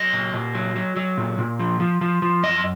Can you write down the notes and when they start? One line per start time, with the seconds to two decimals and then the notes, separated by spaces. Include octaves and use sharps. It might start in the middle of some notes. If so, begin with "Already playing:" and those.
Already playing: F#3 D#5
0.13 A#2
0.34 A#2
0.55 F#3
0.76 F#3
0.96 F#3
1.18 A#2
1.39 A#2
1.59 F3
1.80 F3
2.01 F3
2.22 F3
2.43 F#2 D#5